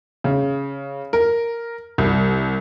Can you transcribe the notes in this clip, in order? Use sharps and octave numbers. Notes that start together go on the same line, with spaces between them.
C#3
A#4
C2